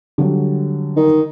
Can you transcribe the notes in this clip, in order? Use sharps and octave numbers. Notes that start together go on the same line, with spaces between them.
D3 F#3 G3
D#3